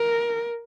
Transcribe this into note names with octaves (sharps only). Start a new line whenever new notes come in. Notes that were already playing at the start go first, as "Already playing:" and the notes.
Already playing: A#4